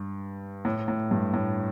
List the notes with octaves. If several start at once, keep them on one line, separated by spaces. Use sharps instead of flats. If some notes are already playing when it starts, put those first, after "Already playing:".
Already playing: G2
A2
A2
G2
A2